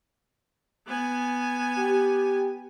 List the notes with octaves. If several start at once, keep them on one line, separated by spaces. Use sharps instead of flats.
B3 G#5
G4